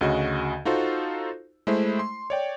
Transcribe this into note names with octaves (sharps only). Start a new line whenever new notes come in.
D2 C#3 F#4 D#5
D#4 F4 F#4 A4 C5
G#3 A3 E4 C5
C6
C#5 D5 G5